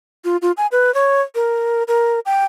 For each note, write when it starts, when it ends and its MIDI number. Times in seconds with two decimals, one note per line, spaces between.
0.25 0.37 65
0.42 0.52 65
0.57 0.67 80
0.72 0.94 71
0.94 1.21 73
1.35 1.83 70
1.88 2.20 70
2.26 2.45 79